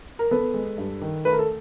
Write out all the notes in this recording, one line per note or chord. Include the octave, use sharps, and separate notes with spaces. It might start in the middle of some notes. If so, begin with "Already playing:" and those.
A#4
B3 A4 B4
G#3
G2
D#3
A3 B4
A#4
A4